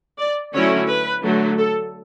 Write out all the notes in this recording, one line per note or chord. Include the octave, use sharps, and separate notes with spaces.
D5
D3 F#3 A3 C#4 E4 C#5
B4
D3 F#3 A3
A4